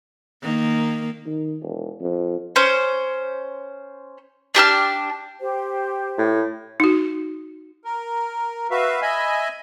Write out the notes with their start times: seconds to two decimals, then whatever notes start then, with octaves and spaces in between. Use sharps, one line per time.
0.43 D#3 A#3
1.26 D#3
1.62 E1
2.01 F2
2.56 C#4 C5
4.55 D4 G4 A5 F6
5.40 G4 C5
6.18 A2
6.80 D#4 F#4
7.85 A#4
8.71 F#4 B4 E5 F5
9.02 D#5 E5 G#5 B5